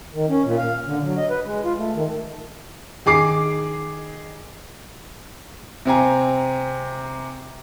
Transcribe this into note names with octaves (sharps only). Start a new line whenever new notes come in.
D#3
C#4
A#2
F5
D3
F#3
D#5
B4
G#3
F4
A3
D#3
D#3 G#4 D6 C7
C3 C4 G#5 A#5